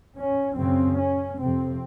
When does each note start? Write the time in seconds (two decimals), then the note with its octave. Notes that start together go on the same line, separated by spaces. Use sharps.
0.16 C#4
0.57 F#2 C#3 C4
0.98 C#4
1.39 F2 C3 C4